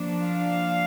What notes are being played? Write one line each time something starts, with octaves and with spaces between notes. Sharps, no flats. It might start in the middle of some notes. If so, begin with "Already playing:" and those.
Already playing: F3 A#3 D4
F5